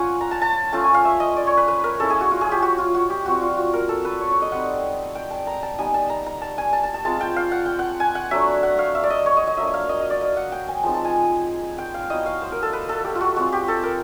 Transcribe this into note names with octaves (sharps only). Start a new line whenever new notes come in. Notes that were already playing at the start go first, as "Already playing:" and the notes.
Already playing: C#4 F4 F#5 G#5
A#5
A5
A5
A3 C#4 F4 A5
G#5
F5
E5
D#5
D5
C#5
B4
B4
A#4
G#3 C#4 E4 A4
G#4
F#4
F4
G#4
G4
F#4
F4
F#4
G4
G3 C4 F4 F#4
F4
F#4
A#4
A4
B4
C#5
C#5
D#5
G3 C4 D#4 F#5
G5
A5
A#5
A5
G3 B3 D#4 G#5
A5
A#5
A#5
A5
G#5
A5
A5
A5
G#3 C4 F4 A5
G5
F5
F#5
G5
F#5
G#5
F#5
F#3 A3 D4 E5
F#5
F5
E5
D5
D#5
C#5
D#5
D#5
F#3 A#3 D4 E5
F5
D#5
D#5
D5
D#5
F#5
G5
G#5
F3 G#3 C4 D#4 A5
A5
G#5
G5
F5
F#3 B3 E4 D#5
F5
C5
A#4
A4
B4
A4
G4
F4
F#4
G#3 C4 F4 F#4
G4
A4
A#4